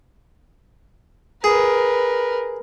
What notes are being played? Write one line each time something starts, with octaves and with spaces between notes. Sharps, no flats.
G#4 A#4 B4